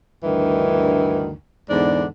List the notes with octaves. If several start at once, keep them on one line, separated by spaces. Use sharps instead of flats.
D2 G2 D#3 E3
E2 G#2 D3 D4